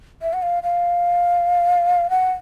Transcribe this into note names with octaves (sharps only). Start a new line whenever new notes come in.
E5
F#5
F5
F5
F#5